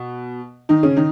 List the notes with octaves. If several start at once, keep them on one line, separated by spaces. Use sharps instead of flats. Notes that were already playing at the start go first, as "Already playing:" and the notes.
Already playing: B2
D#3 D#4
C#3 C#4
D#3 D#4